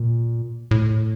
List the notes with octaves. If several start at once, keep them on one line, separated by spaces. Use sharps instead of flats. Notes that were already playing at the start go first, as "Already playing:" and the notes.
Already playing: A#2
A2